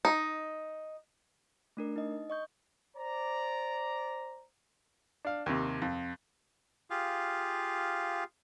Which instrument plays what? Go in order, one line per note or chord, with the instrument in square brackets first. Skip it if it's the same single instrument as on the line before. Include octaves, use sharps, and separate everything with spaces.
[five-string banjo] D#4
[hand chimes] A3 D4 A#4
D#4 D#5
D#5 C#6 G6
[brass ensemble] C5 D5 A#5
[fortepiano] D4 F5
D#2 C3
F2
[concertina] F4 G4 G#4 F5